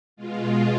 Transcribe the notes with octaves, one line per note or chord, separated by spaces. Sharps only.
B2 G#3 F4